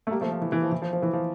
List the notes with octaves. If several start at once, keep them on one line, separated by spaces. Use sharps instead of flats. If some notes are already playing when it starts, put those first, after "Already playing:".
A3
G3 A#3
F3 A3
F3
E3
E3
F3
E3
F3
F3
E3
F3